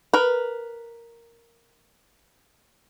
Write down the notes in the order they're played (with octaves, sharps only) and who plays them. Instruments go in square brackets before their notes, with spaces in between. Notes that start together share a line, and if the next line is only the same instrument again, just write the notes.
[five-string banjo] A#4 B4